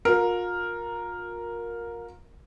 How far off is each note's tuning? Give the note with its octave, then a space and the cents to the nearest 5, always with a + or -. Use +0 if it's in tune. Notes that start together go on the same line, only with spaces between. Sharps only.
F4 +40 A#4 +0